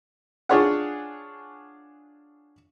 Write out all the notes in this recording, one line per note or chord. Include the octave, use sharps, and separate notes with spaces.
D4 F4 G#4 C#5 D5 F#5